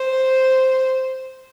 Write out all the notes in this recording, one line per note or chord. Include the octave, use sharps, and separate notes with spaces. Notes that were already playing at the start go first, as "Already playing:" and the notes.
Already playing: C5